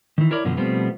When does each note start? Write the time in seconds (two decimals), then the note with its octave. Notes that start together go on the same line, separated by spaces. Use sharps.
0.18 D#3 E3
0.31 E4 A#4 C#5 D5
0.45 F#2 B2 D3 F3
0.57 B2 F3 G3 A3 B3 C4